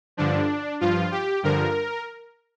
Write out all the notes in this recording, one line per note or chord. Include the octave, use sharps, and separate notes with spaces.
G2 D3 F3 D4
G2 F3 F4
G4
G2 D3 F3 A#4